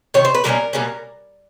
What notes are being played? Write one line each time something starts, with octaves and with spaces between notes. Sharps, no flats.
C3 D#3 C#5
C5
B4
B2 G3 A#3 C#4 A#4
B2 G3 A#3 C#4